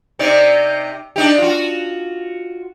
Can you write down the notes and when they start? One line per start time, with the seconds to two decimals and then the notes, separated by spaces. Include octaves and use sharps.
0.19 C3 D#4 D5
1.16 D4 D#4 G4
1.38 F4 F#4